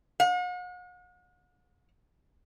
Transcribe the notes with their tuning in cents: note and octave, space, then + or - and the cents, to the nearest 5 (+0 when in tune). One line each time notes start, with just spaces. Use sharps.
F#5 -45